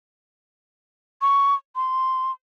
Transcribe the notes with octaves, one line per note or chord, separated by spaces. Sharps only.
C#6
C6